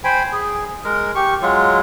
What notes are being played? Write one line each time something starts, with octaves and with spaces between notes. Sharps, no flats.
C5 G5 G#5 B5
G#4
G#3 A#4
G4 C#6
F#3 G#3 F4